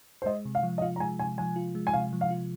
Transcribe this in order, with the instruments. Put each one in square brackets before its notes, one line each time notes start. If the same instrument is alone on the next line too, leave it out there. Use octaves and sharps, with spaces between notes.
[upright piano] C5
[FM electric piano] G#3 [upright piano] D#5
[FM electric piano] C3
[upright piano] F5
[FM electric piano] F3
[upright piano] D#5
[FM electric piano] F4 [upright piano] F5
[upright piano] A#5
[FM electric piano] G#3 [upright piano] G#5
[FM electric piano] C3 [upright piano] G#5
[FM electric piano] F3 [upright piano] G#5
[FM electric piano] F4
G#3
[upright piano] G#5
[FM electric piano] C3 [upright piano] F5
[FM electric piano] F3
[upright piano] F5
[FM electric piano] F4